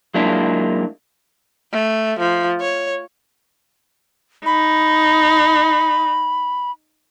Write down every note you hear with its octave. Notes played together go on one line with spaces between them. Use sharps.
F#3 G#3 A#3 D4 E4 F4
A3
F3
C#5
D#4 B5